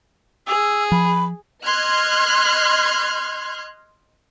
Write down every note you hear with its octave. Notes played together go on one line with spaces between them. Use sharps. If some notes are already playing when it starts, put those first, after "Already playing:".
G#4 E6
F3 B5
D#5 C6 F6 F#6 G#6